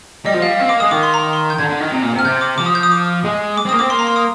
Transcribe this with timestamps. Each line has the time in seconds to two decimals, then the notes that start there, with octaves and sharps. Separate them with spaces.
0.25 G3 D#5
0.34 F3
0.40 G3 F5
0.58 C4 F5
0.69 A#3 D6
0.80 G#3 D#6
0.91 D#3 D6
1.03 C6
1.14 A#5
1.33 C6
1.50 G6
1.58 D3 G#6
1.69 D3
1.80 D#3
1.91 C3
2.02 A#2
2.14 C3
2.19 F6
2.24 C3 G6
2.41 D6
2.58 F3 D6
2.66 D#6
2.75 G6
2.83 D#6
2.92 D6
3.24 G#3
3.57 D6
3.66 C4
3.69 A#3 D#6
3.79 C4 D6
3.90 A#3 C6
3.99 A#5
4.07 C6
4.16 D#6